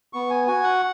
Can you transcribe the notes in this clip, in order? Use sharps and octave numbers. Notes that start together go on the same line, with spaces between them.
B3 C#6
G#5
F#4 G#5
F#5